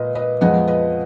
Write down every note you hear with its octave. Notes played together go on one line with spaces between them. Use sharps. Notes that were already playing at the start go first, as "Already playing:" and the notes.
Already playing: A#2 B4 D#5
B4 D#5
F2 F3 G#3 B3 D#5 F#5
B4 D#5